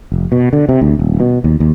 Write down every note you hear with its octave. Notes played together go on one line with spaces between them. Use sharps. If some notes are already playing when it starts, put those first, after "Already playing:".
F1
B2
D3
C3
D2
D#1
B2
D#2
D#2